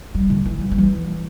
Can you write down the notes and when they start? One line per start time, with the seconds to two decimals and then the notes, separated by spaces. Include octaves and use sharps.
0.15 G3
0.30 D3
0.46 E3
0.61 G3
0.72 G3
0.78 E3